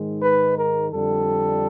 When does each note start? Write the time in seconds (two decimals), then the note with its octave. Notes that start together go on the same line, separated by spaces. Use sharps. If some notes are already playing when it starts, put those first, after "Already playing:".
Already playing: G#2 D#3 G#3
0.23 B4
0.58 A#4
0.90 F2 D3 G3 A4